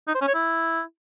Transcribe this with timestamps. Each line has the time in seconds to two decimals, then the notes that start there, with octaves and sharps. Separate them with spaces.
0.08 D#4
0.15 C5
0.21 C#4
0.28 C#5
0.35 E4